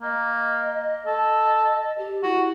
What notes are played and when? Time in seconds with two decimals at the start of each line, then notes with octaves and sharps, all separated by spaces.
0.02 A#3 D#5
1.07 A4
1.98 G4
2.23 E4 F#4